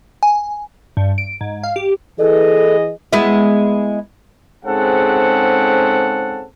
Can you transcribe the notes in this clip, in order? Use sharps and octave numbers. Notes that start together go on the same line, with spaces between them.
G#5
G2
D7
G#2
F5
G4
E3 G#4 A4 D#5
G#3 B3 E4
G#2 C#3 C4 A4 F#5